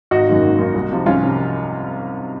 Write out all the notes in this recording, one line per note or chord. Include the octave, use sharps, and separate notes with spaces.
G#1 D#4 F#4
F#2 D#3 A#3
G#1
F#2 D#3 A#3
C2
C3 F3
C2 C#4 F4
C3 F3